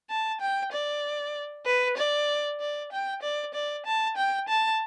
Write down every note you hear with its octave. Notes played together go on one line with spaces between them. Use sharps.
A5
G5
D5
B4
D5
D5
G5
D5
D5
A5
G5
A5